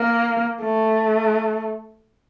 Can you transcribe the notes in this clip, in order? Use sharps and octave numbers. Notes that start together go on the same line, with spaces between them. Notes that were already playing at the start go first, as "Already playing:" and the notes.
Already playing: A#3
A3